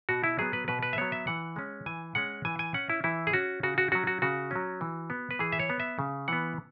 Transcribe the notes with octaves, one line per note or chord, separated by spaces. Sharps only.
B2 F#4
E4
F#3 B3 G#4
B4
B2 B4
B4
E5
F#3 B3 C#5
E5
E3 F#5
G#3 C#4
E3 G#5
G#3 C#4 F#5
E3 G#5
G#5
C#4 F#5
E4
E3 E4
G#4
C#4 F#4
C#3 F#4
F#4
F#3 C#4 F#4
F#4
C#3 F#4
F#3 C#4
E3
B3
B4
E3 G#4
E5
C#5
B3
E5
C#3
E3 B3 F#5